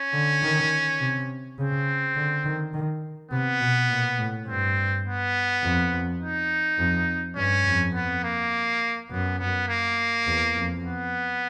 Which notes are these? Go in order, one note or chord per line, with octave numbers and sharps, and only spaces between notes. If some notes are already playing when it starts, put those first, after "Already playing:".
Already playing: C#4
D3
D#3
C3
C#3 C4
D3
D#3
D#3
C3 B3
B2
A#2
A2
G2 C4
B3
F2
D#4
F2
G2 C#4
F2
B3
A#3
F#2 B3
B3
A#3
E2
F2
B3